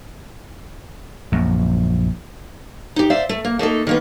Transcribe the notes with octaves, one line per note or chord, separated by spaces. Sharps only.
A#1 F#2
D#4 G4
C5 D5 E5 F5
A3
A#3
A3 A#3 D#4 A4
D#3 A#3 B3